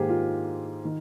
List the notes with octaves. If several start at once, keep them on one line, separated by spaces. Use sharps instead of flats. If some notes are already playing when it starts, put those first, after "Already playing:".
Already playing: G#2 D#3 A#3 G4 G#4 C5
F4
D#3